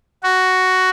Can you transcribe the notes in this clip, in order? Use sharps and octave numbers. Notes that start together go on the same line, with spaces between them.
F#4